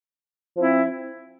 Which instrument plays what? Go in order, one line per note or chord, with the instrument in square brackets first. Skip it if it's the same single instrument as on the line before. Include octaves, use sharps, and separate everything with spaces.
[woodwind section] F3 C4 E4